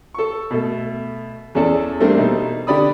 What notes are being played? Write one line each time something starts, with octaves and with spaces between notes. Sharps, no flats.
A4 C#6
B2 A3
E2 C#4 G#4 A4 D5
G3 A3 A#3 C4 D4
B2 D#4
D3 G4 D5 B5 D#6